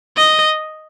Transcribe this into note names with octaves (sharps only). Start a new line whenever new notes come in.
D#5